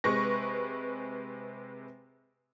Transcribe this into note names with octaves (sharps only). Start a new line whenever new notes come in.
C3 G#3 B4 C#6 A#6